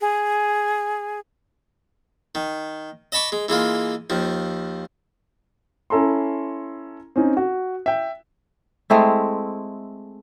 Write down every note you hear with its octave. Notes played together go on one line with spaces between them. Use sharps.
G#4
D#3
D#5 A5 B5 C#6 D6
G#3
E3 G#3 A#3 F4
D#2 F3
C#4 E4 A4 A#5 C6
C4 C#4 D#4
F#4
E5 G5
G#3 A3 C4 E4